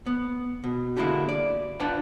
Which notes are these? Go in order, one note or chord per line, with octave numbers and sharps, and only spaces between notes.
B3
B2
D3 G#3 A#3 E4 F#4 G4
D5
D4 F4 B4 F#5 G5 A5